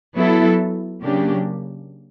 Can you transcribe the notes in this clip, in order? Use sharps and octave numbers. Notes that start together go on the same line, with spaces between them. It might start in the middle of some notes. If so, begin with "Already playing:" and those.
F#3 B3 E4 A4
C#3 F#3 A#3 D4 G4